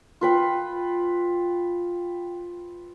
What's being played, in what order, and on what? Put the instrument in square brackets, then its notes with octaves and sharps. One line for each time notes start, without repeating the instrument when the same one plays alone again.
[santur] F4 B4 G5